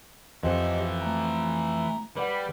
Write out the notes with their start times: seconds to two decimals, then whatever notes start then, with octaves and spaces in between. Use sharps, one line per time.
0.43 F2 E3 G4 A4 C5 D#5
1.02 A3 A#5
2.17 G3 B4 D5 F#5